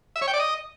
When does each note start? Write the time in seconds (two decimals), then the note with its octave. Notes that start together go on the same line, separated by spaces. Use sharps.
0.16 E5
0.22 C#5
0.28 G5
0.33 D5
0.39 D#5